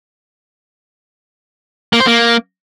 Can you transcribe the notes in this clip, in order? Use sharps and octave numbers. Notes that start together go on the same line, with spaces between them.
A#3
C5
A#3